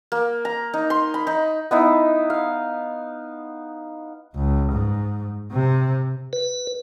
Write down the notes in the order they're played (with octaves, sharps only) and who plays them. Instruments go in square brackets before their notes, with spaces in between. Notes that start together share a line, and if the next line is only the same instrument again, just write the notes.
[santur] A#3
A#5
D#4
C6
B5
D#4
B3 D#4 E4
F5
[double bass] C#2
G#2
C3
[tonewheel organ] B4